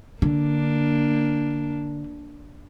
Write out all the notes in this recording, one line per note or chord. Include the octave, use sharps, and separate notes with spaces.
D3 A#3 D4